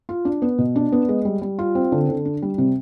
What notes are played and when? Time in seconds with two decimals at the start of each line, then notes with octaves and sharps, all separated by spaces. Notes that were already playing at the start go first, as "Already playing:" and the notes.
0.09 F4
0.25 D4
0.42 B3
0.58 B2
0.76 D4
0.92 B3
1.09 G#3
1.25 G3
1.42 G3
1.59 F4
1.75 C4
1.92 D3
2.09 D3
2.25 D4
2.42 G3
2.58 C3